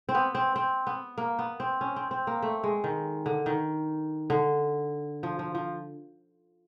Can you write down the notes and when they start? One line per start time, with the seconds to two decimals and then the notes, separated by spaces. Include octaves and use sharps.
0.09 C4
0.15 B3
0.35 C4
0.56 C4
0.87 B3
1.18 A#3
1.39 B3
1.60 C4
1.81 C#4
1.96 C4
2.11 C4
2.27 A#3
2.43 A3
2.64 G#3
2.84 D#3
3.26 D3
3.46 D#3
4.30 D3
5.23 F3
5.39 F3
5.55 F3